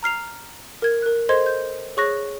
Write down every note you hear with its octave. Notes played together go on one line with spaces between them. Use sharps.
A#5 F6 C7 F7
A#4 G#6
A#4 F#6
A4 C5 D#5 C6 G#6
G6
G#4 C#5 C#6 F#6 A#6